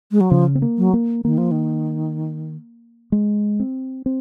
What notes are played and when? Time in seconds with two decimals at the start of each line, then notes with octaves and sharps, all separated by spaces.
0.12 G#3
0.21 F#3
0.30 C#3 F3
0.55 C4
0.62 A#3
0.78 F#3
0.94 A#3
1.24 D#3 A#3
1.38 F3
1.51 D#3
3.12 G#3
3.60 C4
4.06 C4